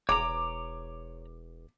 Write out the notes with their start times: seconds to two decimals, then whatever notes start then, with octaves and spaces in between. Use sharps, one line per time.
0.09 E1 C#5 A#5 D6